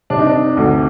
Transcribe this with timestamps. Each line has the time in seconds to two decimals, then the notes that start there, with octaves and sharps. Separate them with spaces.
0.10 C3 D4
0.18 D#4
0.27 D4
0.57 D2